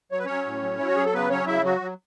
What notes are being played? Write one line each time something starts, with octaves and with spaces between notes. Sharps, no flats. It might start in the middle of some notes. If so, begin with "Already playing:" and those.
F#3 C#5
B4
F#3 C#4 C#5
A2
F#3
F#3 E4
F#4
F#3 G#4
A4
C#3 B3 B4
F#3 C#4 C#5
C#3 E4 E5
F#3 F#4
F#3